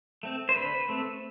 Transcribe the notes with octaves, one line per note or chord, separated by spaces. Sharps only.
A3 C4
C5
D3 B4
A3 C4